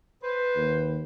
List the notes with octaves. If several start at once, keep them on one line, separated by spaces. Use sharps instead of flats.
B4 C5
D#2